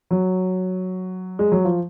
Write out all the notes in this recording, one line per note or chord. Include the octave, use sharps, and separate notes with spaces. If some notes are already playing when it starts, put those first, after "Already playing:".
F#3
G#3
F#3
F3